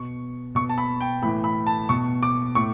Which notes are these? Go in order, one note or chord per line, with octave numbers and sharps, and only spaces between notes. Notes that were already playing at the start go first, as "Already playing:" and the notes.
Already playing: B2 C#6
B2 C#6
A5
B5
G5
A2 E3 B5
B5
A5
B2 C#6
D6
A2 C#6